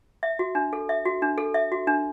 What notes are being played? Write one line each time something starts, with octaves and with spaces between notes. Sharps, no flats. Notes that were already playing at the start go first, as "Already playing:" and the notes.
E5
F#4
D4
A4
E5
F#4
D4
A4
E5
F#4
D4